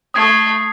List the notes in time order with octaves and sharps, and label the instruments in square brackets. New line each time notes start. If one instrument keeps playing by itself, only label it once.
[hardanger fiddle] A3 [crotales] D#6 G#6 C7